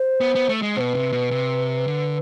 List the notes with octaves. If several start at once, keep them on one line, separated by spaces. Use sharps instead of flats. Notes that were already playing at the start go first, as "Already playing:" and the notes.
Already playing: C5
B3
B3
A3
G#3
B2 B4 C5
C3
B2
C3
D3